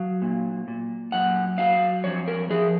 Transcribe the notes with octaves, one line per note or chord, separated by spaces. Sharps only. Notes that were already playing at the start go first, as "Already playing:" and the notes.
Already playing: F#3 F5
A#2
A#2
F#2 F#5
F#3 F5
F2 C#5
A#4
F3 G#4